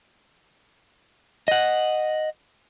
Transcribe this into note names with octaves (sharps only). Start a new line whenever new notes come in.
D#5 F#5